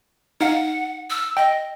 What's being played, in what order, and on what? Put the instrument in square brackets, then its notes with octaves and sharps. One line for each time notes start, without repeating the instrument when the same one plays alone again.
[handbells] D#4 F5 [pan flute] F#5
[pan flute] E6
[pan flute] D#5 [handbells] G5